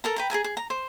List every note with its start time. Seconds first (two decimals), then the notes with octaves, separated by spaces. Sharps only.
0.04 A4 A#4 A#5
0.16 B4 G5 A#5
0.30 G#4 A#4 G#5 A#5
0.44 G#4
0.57 A#5
0.70 C5